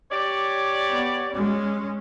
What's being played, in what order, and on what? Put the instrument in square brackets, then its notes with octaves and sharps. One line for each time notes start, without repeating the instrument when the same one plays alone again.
[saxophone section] G4 C#5 D5
[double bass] B3
G#3 C#4